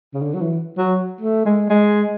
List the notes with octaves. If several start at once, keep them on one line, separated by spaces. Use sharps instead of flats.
C#3
D3
F#3
E3
F#3
A3
G#3
G#3